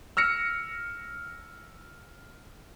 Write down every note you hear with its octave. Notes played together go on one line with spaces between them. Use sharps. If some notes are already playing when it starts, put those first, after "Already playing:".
E6 F6 A#6 C#7